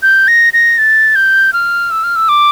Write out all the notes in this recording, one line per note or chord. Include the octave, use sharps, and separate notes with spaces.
G6
A#6
A#6
A6
G6
F6
E6
F6
E6
D6